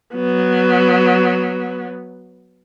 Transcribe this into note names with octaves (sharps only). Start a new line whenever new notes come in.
F#3 B3